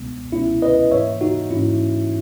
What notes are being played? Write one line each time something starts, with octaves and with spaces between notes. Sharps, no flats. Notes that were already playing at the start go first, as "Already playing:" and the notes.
Already playing: C#2 B2 G#3 B3
C#2 B2 G#3 B3 C#4 E4
B4 D#5
G#2 E3 A#3 C#5 E5
D#4 F#4
G#2 E3 A#3 C#4 E4